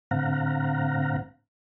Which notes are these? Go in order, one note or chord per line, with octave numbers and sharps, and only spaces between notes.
A2 D3 C4 F5 F#5 A#5